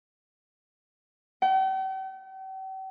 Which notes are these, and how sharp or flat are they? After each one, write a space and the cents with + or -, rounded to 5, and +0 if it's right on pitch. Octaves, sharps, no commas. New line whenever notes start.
G5 -45